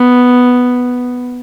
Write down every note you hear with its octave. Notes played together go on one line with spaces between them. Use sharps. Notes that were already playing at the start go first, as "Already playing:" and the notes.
Already playing: B3